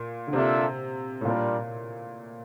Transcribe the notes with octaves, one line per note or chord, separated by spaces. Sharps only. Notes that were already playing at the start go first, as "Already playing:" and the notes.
Already playing: A#2
D3
C3 A#3 D4 F4 A4 E5
A2
A#2 G3 D4 F4 A#4 D5